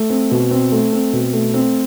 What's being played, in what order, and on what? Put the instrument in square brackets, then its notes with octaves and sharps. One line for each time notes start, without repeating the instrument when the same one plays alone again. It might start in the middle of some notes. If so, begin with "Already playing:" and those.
Already playing: [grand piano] A3
C4
B2
C4
A3
C4
B2
A3
C4